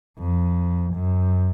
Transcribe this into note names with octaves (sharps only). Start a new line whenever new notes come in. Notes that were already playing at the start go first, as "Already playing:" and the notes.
F2
F#2